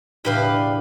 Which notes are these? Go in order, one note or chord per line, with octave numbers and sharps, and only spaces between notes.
E1 A2 C#3 D4 G4 B4 F5